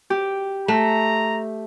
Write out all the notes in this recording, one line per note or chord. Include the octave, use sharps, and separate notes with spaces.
G4
A3 A#5